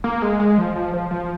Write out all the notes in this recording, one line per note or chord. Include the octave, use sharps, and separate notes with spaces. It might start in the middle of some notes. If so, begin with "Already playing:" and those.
A#3
G#3
G#3
F3
F3
F3
F3